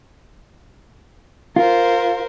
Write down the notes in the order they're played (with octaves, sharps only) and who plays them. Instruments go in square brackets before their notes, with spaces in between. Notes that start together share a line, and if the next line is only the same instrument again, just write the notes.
[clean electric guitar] F4 [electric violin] A#4 C5